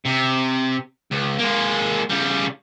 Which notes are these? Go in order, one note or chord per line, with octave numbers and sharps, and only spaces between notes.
C3
C#2
G#3 A#3
C#3 G3